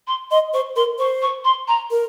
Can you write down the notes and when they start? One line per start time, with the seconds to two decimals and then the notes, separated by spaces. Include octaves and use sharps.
0.07 C6
0.30 D#5 C6
0.54 C5 C#6
0.76 A#4 C6
0.99 C5 C#6
1.22 C#6
1.45 C6
1.68 A#5
1.91 A#4